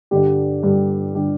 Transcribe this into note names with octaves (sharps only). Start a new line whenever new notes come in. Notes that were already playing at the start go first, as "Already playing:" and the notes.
G2 D3 G3 D4 G4
G2 D3 G3 D4
D3 G3 D4 G4